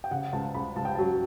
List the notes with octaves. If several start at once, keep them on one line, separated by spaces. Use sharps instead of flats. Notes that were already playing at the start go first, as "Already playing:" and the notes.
G5
C#3 F#5
C#2 A5
C#2 B5
C#2 A5
G5
F#3 A5